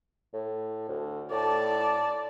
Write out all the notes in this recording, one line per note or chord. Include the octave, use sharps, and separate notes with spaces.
A2
D2
A2 D5 A5